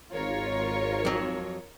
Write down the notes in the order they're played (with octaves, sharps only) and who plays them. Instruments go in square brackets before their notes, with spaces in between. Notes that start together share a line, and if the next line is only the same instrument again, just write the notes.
[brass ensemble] G#1 [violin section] F4 A#4 C#5
[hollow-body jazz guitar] F2 F#3